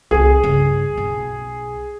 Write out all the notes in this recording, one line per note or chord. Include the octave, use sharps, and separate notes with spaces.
C2 D#3 G#4
G2 C#3
B1